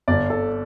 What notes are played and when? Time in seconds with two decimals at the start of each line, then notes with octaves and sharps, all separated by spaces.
0.08 G1 D5
0.30 A4